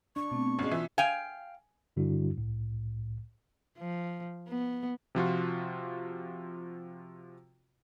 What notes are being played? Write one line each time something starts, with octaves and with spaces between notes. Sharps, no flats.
D4 C#6
B2 A3 C4
G#1 G#3 C#4
E3 F4 E5
F5 G5 G#5
G2 D3 G3 D4 E4 F#4
C2 A2
F3
B3
C3 F3 F4 F#4